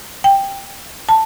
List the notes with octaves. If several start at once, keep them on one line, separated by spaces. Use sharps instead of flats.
G5
A5